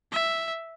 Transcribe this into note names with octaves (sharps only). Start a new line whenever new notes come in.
E5